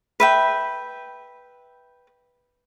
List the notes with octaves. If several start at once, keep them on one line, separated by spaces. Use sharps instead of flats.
B4 E5 G5